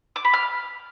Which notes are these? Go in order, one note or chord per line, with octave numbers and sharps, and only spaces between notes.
D6
B5
F6